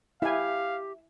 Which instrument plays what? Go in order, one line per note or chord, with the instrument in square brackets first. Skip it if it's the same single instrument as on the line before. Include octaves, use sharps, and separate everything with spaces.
[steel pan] E4 G#5 [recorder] G4 [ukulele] E5 [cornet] F5